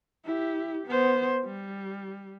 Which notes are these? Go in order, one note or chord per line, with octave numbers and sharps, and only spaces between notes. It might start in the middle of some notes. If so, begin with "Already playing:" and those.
E4 G4
B3 C5
G3